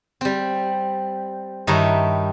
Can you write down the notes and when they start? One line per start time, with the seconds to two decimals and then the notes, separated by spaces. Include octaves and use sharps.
0.21 G3 C4
1.67 G2 D#3 D#4 E4 C#5 A#5